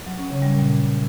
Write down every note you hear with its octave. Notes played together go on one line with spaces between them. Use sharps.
F#3
C#4
C#3
G3
A#2